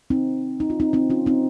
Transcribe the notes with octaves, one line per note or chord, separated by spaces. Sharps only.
C4 D#4
D#4
F4
C4 D#4
C4 D#4
C#4 F4
C4 D#4